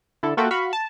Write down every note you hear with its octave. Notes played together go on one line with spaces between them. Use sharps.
D3 E4 A4
A#3 F4 F#4 A4 E5 G5
F#4 F5 B5 C#6
A5